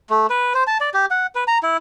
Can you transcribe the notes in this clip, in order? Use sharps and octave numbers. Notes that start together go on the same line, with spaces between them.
A3
B4
C5
A5
D5
G4
F#5
B4
A#5
E4